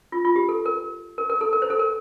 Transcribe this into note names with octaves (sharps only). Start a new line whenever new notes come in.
F4
F4
G4
A4
A#4
A#4
A#4
A4
A#4
C5
A4
A#4